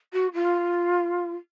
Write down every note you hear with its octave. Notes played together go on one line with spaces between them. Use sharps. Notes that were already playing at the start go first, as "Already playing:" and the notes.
F#4
F4